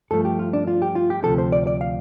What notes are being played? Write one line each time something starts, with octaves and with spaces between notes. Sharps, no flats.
G2 F3 A3 A4
G4
F4
D4
F4
G4
F4
G4
D2 C3 F3 A4
C5
D5
D5
F5